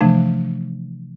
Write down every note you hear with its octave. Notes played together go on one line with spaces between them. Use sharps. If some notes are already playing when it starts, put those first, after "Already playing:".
C3 E3 F3 A3 D4